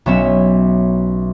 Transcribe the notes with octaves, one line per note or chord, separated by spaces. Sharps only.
B1 B3 C#4 E5